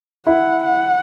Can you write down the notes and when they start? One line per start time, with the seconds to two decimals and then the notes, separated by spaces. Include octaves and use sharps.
0.26 E4 F#5
0.64 F#5